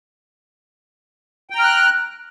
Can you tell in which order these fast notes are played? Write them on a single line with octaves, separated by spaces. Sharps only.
G5 A#5 F6 F#6